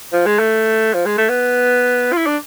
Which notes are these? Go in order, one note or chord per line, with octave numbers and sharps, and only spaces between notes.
F3
G#3
A3
F3
G#3
A3
B3
F4
E4
D4